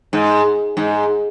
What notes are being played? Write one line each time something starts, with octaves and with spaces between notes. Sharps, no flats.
G#2
G#2